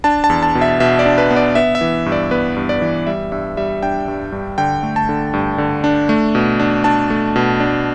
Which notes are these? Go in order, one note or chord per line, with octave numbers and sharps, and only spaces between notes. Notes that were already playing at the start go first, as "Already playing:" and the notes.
D4 A5
A5
E2
A5
B2
E5
B2 E5
D5
D4
B4
B3
D5
B3 E5
E5
E3
G2
D5
B3 B4
G2
D5
E3
G3 E5
G2 E5
G3 E5
D4 G5
G2
G2
D3 G5
A3
A5
D3
G2
D3
D4
A3
B2
D4
D4 A5
A3
B2
D4